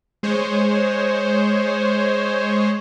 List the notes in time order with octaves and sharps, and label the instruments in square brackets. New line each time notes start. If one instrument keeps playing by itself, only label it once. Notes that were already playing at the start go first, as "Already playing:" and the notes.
[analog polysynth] G#3 G#4 C5 C#5